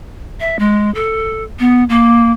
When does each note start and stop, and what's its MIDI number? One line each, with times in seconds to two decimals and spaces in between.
0.40 0.57 76
0.59 0.93 56
0.95 1.43 69
1.59 1.84 59
1.89 2.31 58